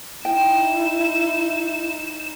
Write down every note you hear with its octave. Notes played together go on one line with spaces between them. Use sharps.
D#4 E4 G5 E7